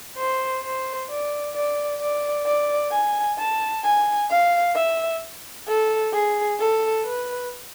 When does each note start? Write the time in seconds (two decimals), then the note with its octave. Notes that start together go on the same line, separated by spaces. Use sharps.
0.17 C5
0.63 C5
1.09 D5
1.55 D5
2.01 D5
2.46 D5
2.92 G#5
3.39 A5
3.84 G#5
4.30 F5
4.75 E5
5.68 A4
6.13 G#4
6.60 A4
7.05 B4